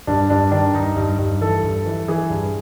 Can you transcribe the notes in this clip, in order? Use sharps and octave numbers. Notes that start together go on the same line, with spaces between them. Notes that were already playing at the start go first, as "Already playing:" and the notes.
G2 D4
G2 D4
D#3 D4
G2 D#4
G2
G2
E3 A4
G2
E3
E3 G#4
G2